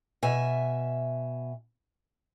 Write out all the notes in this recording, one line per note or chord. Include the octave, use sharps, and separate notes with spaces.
B2 E5 G#5